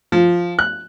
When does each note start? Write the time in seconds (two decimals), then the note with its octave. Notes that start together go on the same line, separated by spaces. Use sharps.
0.12 F3
0.59 F#6